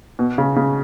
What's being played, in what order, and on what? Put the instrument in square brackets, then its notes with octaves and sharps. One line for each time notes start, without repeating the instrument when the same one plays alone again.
[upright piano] B2
C#3
C#3